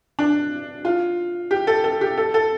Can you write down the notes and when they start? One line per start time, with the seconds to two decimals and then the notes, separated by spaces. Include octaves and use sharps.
0.19 D4
0.85 F4
1.51 G4
1.67 A4
1.84 A4
2.01 G4
2.18 A4
2.34 A4